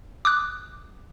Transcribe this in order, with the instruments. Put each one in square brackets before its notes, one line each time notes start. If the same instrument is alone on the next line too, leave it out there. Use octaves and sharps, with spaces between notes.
[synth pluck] D6 D#6 F#6